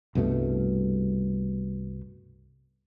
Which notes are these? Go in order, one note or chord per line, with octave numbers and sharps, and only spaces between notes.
C2 G2 B2 A3